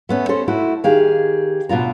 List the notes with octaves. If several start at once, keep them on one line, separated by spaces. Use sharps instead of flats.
A3 B3 C#4
C#4 A4 C5
A3 E4 F#4
D#3 G4 G#4 F5
D2 B2 D4 F4 A#5